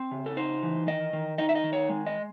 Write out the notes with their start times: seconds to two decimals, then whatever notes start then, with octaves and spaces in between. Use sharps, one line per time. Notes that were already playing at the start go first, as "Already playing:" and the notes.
Already playing: C4
0.11 C#3
0.26 A4
0.37 D#4 C5
0.63 E3
0.87 D#3 D#5
1.13 D#3
1.38 D#4 D#5
1.49 E5
1.55 D#5
1.64 D#3
1.73 C#5
1.89 G#3
2.07 D#5